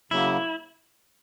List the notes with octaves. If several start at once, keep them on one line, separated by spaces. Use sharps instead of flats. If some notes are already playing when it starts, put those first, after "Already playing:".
C#3 F#3 A#3 E4